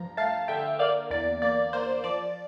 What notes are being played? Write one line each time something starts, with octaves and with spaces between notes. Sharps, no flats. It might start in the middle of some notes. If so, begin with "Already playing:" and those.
Already playing: G2 F3 A#5
A3 F5 A5
D3 E5 G5
A#3 D5 F5
E2 D5
A#3 D5
A#3 C5
F3 D5